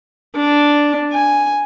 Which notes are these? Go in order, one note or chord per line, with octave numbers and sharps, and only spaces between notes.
D4
G#5